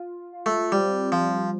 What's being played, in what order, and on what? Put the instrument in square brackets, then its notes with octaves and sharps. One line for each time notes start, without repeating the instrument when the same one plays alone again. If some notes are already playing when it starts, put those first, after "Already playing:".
Already playing: [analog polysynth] F4
F4
[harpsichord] A3
[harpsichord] G3 [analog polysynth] C4
[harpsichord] F3 [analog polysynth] G3